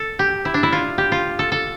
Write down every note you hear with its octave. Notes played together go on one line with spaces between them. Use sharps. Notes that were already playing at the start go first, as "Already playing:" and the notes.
Already playing: A4
G4
E4
D4
E4
F4
G4
F4
A4
A4